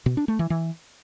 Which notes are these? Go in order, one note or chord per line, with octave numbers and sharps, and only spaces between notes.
B2
D4
A3
E3
E3